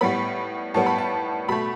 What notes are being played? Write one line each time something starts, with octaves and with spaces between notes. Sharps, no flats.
A2 G3 B3 B5
A2 G3 B3 A5
B5
A5
B2 A3 B5